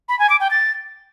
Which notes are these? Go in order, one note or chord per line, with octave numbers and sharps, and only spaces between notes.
B5
G#5
D6
G5
A6